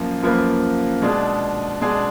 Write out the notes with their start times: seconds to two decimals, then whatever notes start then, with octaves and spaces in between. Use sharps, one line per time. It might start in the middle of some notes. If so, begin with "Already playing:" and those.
Already playing: F#2 F3 A#3 F4
0.22 F#2 F3 A#3 F4 B4
1.02 B2 G#3 D4 G#4
1.81 B2 G#3 D4 G#4